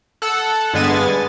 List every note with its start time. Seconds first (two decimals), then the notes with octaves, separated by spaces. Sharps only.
0.22 A4 F#5
0.73 G2 D3 G#3 B3 G#5 A6